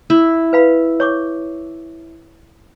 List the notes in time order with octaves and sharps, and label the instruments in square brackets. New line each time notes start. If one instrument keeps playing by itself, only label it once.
[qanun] E4
[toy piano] B4 F5 B5
C#5 C#6 D6